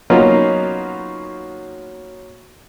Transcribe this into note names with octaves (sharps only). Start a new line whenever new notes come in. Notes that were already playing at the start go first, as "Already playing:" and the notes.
F#3 A#3 B3 C#4 D#4 F4